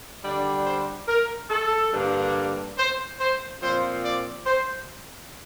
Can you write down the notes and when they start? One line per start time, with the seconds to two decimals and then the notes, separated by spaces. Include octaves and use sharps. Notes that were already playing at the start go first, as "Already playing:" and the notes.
0.24 D3 G3 D4 D5
0.66 C5
1.08 A#4
1.50 A4
1.93 G2 D3 G3 A#3 D4
2.78 C5
3.20 C5
3.62 A#2 F3 C4 C5
4.04 D5
4.46 C5